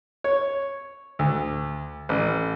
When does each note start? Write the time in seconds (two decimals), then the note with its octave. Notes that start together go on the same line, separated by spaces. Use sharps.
0.24 C#5
1.19 D2
2.09 A1